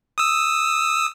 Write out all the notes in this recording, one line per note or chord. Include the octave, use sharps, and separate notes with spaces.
D#6 E6